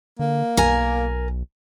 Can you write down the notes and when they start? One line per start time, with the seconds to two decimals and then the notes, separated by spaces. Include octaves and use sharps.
0.19 D3 A#3
0.57 B1 A#4 G#5